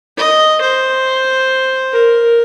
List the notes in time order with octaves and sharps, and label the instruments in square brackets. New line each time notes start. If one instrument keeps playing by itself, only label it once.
[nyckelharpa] D#5
C5
A#4